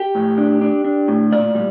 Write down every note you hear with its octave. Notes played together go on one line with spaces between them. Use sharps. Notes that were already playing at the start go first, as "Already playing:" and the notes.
Already playing: G4
A2
D4
D4
D4
A2
A#2 D5
G3